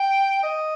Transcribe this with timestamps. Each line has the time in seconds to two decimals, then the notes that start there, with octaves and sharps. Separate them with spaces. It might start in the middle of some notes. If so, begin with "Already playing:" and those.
Already playing: G5
0.43 D#5